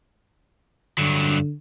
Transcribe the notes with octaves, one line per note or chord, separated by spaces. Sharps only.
G2 D3 F#3